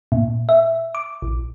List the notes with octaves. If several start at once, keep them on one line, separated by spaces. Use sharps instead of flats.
A#2
E5
D6
A#1